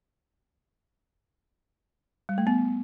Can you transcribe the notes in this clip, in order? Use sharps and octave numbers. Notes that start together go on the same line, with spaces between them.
G3
A3
B3